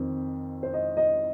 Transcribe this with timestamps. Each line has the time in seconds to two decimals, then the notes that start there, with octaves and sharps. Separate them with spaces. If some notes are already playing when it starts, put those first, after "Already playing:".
Already playing: F2 D#3 C4
0.63 C5
0.74 D#5
0.97 D#5